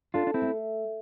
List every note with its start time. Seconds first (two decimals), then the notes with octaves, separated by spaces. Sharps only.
0.14 D4 F4 A4
0.27 D4
0.34 C4 E4
0.42 A3